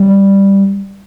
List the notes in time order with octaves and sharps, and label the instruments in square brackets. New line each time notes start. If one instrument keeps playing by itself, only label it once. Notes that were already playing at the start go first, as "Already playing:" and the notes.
Already playing: [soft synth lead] G3